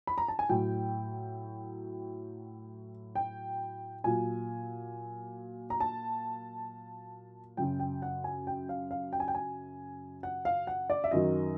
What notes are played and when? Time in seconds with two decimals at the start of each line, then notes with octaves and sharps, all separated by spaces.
0.07 B5
0.18 A#5
0.28 A5
0.39 G#5
0.49 A2 F#3 G5
3.15 G5
4.04 A#2 F#3 G#5
5.70 A#5
5.80 A5
7.57 F#2 C#3 F#3 G5
7.80 G5
8.02 F#5
8.24 G#5
8.47 G5
8.69 F5
8.91 F5
9.13 G5
9.20 G#5
9.28 G5
9.35 G#5
10.23 F#5
10.45 F5
10.67 F#5
10.90 D5
11.04 E5
11.11 F#2 D#3 F#3 D#5